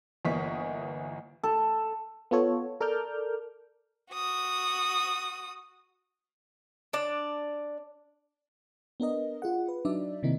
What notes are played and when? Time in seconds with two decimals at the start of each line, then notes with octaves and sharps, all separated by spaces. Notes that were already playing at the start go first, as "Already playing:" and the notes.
0.25 G1 E3 A#3 D#5 C#6 B6
1.43 A4
2.31 B3 F4 A4 C#5
2.81 A4 A#4 D5 D6 F6 G6
4.13 F#4 D#6
6.93 D4 D5
9.00 B3 D4 A#4 D#5
9.42 F4 G#4 F#5
9.68 B4
9.85 F#3 D4 D#4 D5 E5
10.23 C3 D#3 A#3 C4 D#4 E4